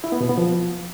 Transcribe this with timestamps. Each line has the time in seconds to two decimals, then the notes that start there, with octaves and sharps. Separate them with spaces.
0.04 E4
0.12 B3
0.21 B2
0.29 B3
0.37 F3